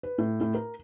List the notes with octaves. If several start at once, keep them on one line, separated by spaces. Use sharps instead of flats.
B4
A2
A2
A#4